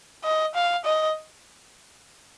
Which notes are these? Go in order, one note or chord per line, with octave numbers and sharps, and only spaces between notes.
D#5
F5
D#5